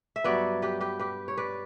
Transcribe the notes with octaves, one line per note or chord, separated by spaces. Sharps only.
E5
G2 F#3 B3 B4 D5
G4 B4
G4 B4
G4 B4
C#5
B4 D5